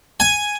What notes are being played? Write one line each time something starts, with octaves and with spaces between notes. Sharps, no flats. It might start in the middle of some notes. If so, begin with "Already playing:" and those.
G#5